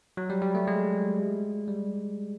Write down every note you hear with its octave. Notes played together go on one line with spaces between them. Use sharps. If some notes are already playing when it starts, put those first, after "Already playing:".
F#3
G3
G3
A3
G#3
G3